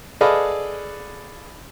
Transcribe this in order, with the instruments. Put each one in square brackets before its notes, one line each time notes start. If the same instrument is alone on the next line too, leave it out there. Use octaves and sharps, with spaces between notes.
[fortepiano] G#4 A4 B4 D5 D#5 F5